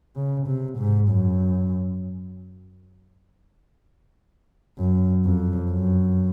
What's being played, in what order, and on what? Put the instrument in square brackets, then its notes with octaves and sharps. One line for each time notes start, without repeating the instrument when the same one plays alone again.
[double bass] C#3
C3
G#2
F#2
F#2
F2
F#2